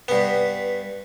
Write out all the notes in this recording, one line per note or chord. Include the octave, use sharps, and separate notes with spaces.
G2 B3